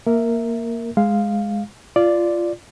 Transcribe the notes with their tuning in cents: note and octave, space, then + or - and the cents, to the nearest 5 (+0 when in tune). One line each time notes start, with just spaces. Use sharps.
A#3 +0 A#4 -10 E5 +0
G#3 +0 F5 +0
F4 -15 D5 +0